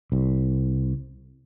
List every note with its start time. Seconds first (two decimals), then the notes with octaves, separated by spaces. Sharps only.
0.12 C2